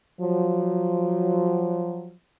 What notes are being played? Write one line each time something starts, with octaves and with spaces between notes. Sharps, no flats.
F3 F#3